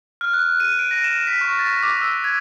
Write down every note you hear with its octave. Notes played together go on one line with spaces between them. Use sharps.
F6
F#6
D#7
D7
A#6
E7
B6
C#6
A6
D6
E6
G#6